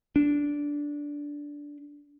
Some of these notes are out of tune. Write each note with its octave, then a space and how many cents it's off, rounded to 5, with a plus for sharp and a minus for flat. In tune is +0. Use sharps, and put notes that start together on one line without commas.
D4 -10